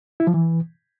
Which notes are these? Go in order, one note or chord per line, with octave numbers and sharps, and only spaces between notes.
E4
F3
E3